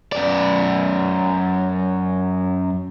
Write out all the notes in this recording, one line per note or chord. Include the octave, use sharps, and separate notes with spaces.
F#2 D5